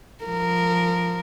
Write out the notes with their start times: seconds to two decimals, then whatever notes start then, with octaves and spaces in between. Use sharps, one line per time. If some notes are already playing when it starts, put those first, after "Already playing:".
0.25 F3 A#4